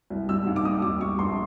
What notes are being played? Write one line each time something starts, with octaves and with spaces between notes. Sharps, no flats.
C2
G3 E6
D#2
D6
G3 D#6
G3 D6
G3 C#6
A#1 C6